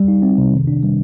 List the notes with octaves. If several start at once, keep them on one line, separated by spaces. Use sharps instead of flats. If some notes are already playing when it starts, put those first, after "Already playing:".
Already playing: G3
D#4
C4
C3
D#3
D4
G3